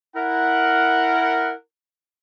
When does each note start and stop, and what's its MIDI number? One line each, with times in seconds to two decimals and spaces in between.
0.15 1.52 64
0.15 1.52 70
0.15 1.52 78